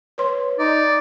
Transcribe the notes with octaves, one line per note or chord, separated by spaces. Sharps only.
B4 C#5 C6
D#4 D5